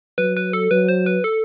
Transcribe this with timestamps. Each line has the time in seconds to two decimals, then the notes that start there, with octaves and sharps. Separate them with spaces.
0.18 F#3 B4
0.37 B4
0.53 A4
0.71 F#3 B4
0.89 C5
1.06 B4
1.24 A4